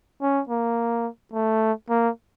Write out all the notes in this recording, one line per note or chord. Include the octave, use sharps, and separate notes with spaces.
C#4
A#3
A3
A#3